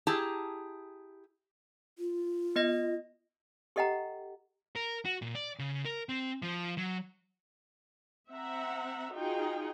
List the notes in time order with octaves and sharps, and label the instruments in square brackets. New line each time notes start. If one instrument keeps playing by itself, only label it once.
[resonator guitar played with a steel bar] E4 G4 G#4 A5 A#5
[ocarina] F4
[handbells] B3 D#5 A#6
[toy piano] G4 A4 D#5 F#5 G5 A#5
[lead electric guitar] A#4
F#4
A#2
D5
C#3
A#4
C4
F3
F#3
[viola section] C4 E5 F#5 A#5
D#4 F4 F#4 G#4 G5